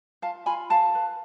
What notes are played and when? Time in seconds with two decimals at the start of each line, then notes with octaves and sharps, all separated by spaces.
0.22 F4 F5 A5
0.46 F4 G#5 B5
0.70 A4 F5 A5
0.95 B4